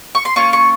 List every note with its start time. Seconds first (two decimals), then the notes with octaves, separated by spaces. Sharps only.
0.15 C#6
0.25 C6
0.36 A#3 C#4 F4 C#6
0.53 C#6